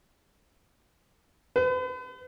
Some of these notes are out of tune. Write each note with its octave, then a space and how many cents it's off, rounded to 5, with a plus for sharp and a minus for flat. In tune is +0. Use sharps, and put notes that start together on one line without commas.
B4 +40